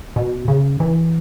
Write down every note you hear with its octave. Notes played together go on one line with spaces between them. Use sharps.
B2
C#3
E3